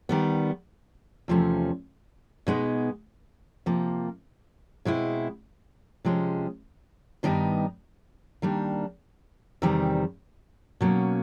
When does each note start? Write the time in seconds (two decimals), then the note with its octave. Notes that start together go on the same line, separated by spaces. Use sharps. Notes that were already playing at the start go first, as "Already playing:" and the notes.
0.09 D#3 G3 B3
1.28 E2 C3 F3 A3 C#4
2.47 B2 G#3 B3 D#4
3.66 C3 F3 A#3
4.85 B2 G#3 C4 E4
6.05 C3 F3 G#3 C#4
7.23 G2 D#3 G3 B3 D#4
8.42 D#3 G3 A#3 D4
9.62 E2 C3 D#3 G3 C4
10.81 B2 F#3 A#3 C#4